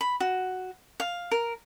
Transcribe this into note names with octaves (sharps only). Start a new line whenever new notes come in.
B5
F#4
F5
A#4